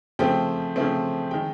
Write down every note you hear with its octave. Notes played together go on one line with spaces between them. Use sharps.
C#3 F3 A3 C4 G5
C#3 F3 A3 C4
D#3 G#3 G5